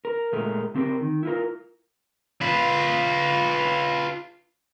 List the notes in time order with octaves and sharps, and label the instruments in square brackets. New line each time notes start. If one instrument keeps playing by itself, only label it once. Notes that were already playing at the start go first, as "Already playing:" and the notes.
[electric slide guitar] A#4
A#2 G#3 A3 A#4
C#3 C4 G4 A#4
D#3
E4 F4 A#4
[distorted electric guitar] F4 B4